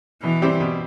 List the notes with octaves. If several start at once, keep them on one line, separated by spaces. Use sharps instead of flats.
B2 E3
G3 C4 E4 G4
B2